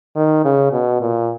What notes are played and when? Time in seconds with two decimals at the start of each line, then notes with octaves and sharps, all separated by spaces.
0.16 D#3
0.45 C#3
0.72 B2
1.01 A#2